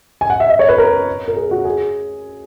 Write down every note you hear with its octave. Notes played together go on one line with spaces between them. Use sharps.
G#5
F#5
E5
D#5
C#5
B4
A#4
A#4
G#4
F#4
G#4